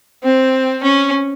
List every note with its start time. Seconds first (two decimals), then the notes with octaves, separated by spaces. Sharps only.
0.23 C4
0.83 C#4